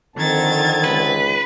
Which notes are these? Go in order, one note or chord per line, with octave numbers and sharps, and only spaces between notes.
F2 D3 D#3 C4 A5 G#6 A6
C#2 B4